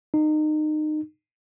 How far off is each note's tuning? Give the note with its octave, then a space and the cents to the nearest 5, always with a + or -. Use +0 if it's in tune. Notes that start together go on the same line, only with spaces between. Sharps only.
D#4 -25